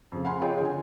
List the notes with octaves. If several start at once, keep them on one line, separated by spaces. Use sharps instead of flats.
F2 C#3
F5 F#5 G#5 B5 C6
F4 G#4 C#5 D#5 G5
D3 G#5